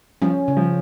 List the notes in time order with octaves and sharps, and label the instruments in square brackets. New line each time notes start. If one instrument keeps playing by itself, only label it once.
[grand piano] F3 [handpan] C#4
[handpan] C#3
[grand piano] F3